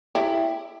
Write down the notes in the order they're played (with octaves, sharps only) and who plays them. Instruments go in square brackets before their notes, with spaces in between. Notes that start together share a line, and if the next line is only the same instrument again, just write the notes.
[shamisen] E4 G4